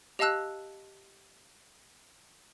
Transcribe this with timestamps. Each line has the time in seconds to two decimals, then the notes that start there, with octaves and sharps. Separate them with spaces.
0.19 G4 D#5 F5 A5 E6 F#6